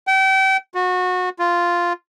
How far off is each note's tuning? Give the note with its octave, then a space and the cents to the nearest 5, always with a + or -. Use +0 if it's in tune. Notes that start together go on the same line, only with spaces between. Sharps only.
G5 -35
F#4 -25
F4 -5